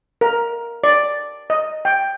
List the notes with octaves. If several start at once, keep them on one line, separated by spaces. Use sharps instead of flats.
A#4
D5
D#5
G5